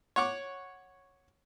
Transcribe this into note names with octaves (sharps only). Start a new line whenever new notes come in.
C#5 F#5 C#6 D6